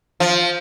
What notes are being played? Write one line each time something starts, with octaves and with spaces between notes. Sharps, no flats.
F3